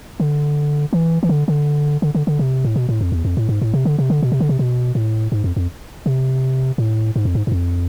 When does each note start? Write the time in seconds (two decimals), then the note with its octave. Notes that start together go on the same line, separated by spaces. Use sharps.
0.20 D3
0.93 E3
1.23 E3
1.29 D3
1.48 D3
2.02 D3
2.15 D3
2.27 D3
2.39 C3
2.64 A2
2.76 B2
2.89 A2
3.01 F2
3.12 E2
3.25 F2
3.37 A2
3.49 G#2
3.61 A2
3.74 C3
3.85 D3
3.98 C3
4.10 D3
4.23 B2
4.32 C3
4.40 D3
4.49 C3
4.59 B2
4.95 A2
5.32 G#2
5.44 F2
5.56 F2
6.06 C3
6.78 A2
7.16 G#2
7.25 F2
7.35 G#2
7.47 G#2
7.52 F2